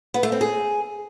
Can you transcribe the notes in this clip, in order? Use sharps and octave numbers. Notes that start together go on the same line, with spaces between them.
B3
A3
C4
G#4